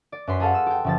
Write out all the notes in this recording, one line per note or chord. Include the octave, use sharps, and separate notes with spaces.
D5
F#2 B4 C6 B6
G#4 A4 F5 F#5
D#6 E6
G4 G5
F#1 F3 A6